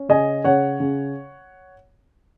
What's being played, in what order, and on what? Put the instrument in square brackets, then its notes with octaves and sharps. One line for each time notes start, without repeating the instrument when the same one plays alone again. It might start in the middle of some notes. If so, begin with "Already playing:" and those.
Already playing: [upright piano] C#4
C#3 D#5 G#5
C#3 C#5 F#5
C#3